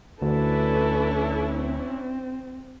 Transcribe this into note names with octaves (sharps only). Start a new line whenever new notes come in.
D2 C#4 D4 E4 A4 B4
C4